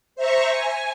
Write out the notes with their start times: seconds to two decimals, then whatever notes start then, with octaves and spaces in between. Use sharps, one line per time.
0.16 C5 E5 A#5 C#6
0.50 G#5